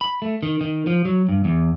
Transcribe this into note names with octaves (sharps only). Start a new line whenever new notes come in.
B5
A3
D#3
D#3
F3
F#3
G2
E2